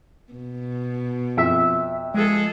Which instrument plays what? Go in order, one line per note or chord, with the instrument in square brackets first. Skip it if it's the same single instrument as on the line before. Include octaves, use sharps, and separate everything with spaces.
[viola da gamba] B2
[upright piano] F2 [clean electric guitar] E5
[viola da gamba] F3 G#4 A4 [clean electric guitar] G#3